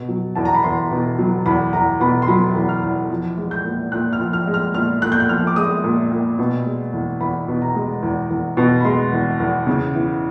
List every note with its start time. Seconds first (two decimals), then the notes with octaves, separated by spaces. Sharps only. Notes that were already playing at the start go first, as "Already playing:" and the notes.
Already playing: B2
0.09 F#3
0.35 E2 A5
0.45 A#5
0.55 B5
0.64 E2 C6
0.91 B2
1.19 F#3
1.46 E2 B5
1.73 E2 A#5
2.00 B2 B5
2.22 C6
2.28 F#3 B5
2.56 E2
2.69 F6
2.83 E2
3.10 F3
3.37 G#3
3.51 G6
3.65 A#2
3.92 A#2 F#6
4.13 F6
4.19 F3
4.33 F6
4.47 G#3
4.54 F6
4.74 A#2 F6
5.02 A#2 F#6
5.12 G6
5.20 F#6
5.29 F3 F6
5.47 D6
5.56 G#3 D#6
5.84 A#2
6.11 A#2
6.39 B2
6.65 G#3
6.93 E2
7.21 E2 B5
7.48 B2
7.62 A#5
7.75 G#3
8.03 E2
8.30 E2
8.57 B2
8.80 B5
8.85 G#3 C6
9.12 E2
9.40 E2
9.67 C#3
9.95 E3